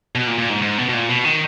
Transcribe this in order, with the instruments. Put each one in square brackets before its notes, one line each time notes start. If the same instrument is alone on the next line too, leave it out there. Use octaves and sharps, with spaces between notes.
[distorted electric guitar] B2
A#2
A#2
G#2
G#2
B2
B2
A#2
B2
D#3